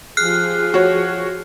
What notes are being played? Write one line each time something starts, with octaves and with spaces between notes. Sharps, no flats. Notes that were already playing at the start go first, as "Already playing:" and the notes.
F3 G4 G#4 F6 F#6 C7
F#4 C#5